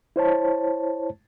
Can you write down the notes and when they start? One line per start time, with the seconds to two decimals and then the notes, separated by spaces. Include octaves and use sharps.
0.16 E4 C5 C#5 A5